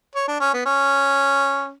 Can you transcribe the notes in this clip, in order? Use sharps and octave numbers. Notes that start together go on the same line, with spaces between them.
C#5
D4
C#4
B3
C#4